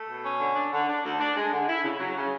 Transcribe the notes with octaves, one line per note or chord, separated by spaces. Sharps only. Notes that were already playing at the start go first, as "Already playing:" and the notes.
Already playing: A3
B2
C#4
D3
D4
D3
D4
D2
D4
G#3
D3
E4
C#3
F#3
C#3